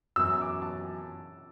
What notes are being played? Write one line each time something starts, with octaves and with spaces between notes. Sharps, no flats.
F#2 E3 B3 F#4 E6
D6
A5